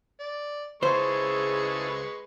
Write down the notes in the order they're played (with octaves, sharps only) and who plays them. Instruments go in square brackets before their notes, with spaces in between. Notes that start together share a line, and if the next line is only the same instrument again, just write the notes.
[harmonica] D5
[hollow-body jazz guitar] C#2 C5 [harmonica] G#3 B4 C#6 [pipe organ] E4 G#4 A4